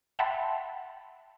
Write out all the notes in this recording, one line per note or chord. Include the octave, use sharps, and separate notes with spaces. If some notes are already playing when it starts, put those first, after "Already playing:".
E5 F#5 G5 A5 B5 C6